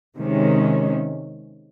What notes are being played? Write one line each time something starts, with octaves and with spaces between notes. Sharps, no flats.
C3 D#3 G#3 C#4